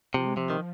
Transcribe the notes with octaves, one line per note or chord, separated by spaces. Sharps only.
C3 F3
G#3
C3 F3
D#3